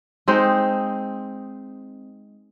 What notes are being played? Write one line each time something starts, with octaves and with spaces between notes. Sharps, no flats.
G#3 C4 D#4